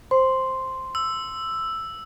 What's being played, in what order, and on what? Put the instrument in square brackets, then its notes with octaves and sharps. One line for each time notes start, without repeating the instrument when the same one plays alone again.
[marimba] C5 [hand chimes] C6
[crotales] E6